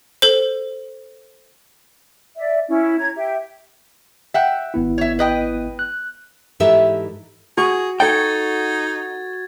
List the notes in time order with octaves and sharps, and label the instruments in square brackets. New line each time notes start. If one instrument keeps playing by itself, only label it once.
[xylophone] A4 C5
[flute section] D5 E5
C#4 E4
C#5 A#5 G#6
G4 E5 G5
[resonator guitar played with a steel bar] E5 F#5 G5
[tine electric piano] G#1 B3 E4
[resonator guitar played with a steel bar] C#5 E5
B4 D#5 G5
[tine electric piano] F#6
[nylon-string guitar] G#2 E3 G4 A4 E5
[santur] F#4 C#6 [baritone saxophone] G#4
[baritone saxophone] D#4 [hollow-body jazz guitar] A4 G5 [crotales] G#6 A6